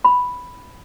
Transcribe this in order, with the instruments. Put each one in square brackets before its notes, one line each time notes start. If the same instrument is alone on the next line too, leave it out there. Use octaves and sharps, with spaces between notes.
[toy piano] B5